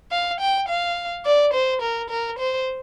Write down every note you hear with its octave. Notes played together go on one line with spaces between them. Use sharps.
F5
G5
F5
D5
C5
A#4
A#4
C5